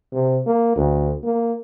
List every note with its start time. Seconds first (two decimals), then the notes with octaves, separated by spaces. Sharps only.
0.12 C3
0.47 A#3
0.76 D2
1.24 A#3